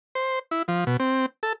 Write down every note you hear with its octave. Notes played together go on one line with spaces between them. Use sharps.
C5
E4
F3
B2
C4
A4